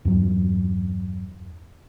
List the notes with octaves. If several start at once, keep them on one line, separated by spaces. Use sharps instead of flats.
E2 G2 F#3